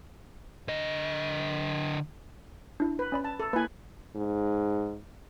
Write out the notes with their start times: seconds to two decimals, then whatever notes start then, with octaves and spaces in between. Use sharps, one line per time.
0.68 D3 D#5
2.80 D4 E4
2.99 B4
3.12 C#4 D5 B5
3.25 A5
3.40 A4
3.53 A#3 E4 B4 G#5
4.16 G#2